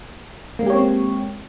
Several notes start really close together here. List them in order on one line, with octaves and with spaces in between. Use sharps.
A#3 G#3 G4 C#5 C4